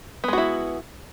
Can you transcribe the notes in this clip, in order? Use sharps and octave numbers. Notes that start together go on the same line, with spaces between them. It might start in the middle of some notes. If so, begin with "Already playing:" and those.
G#3 B3 E4 F#4